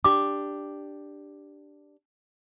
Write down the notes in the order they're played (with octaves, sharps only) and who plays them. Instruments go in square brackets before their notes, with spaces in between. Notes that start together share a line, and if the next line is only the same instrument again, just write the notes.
[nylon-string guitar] D4 G4 [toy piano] D6